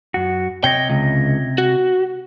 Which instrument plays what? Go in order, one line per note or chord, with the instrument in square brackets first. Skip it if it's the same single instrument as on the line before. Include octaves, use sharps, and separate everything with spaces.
[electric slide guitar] F#2 F#4
[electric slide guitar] C3 C#5 D#5 [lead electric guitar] G5
[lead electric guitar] C#2
F#4